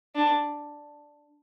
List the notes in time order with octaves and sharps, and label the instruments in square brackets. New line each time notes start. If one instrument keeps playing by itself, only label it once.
[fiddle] D4